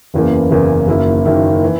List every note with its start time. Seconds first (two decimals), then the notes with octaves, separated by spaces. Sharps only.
0.14 F#1 E2 C#3 E3 A#3
0.51 F#1 E2 C#3 E3 A#3
0.88 F#1 F#2 D#3 A#3 E4
1.25 F#1 F#2 D#3 A#3 E4
1.64 E3